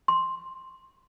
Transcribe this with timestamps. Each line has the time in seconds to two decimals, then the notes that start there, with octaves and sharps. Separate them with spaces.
0.08 C6